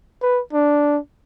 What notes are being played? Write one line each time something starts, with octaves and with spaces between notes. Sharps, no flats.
B4
D4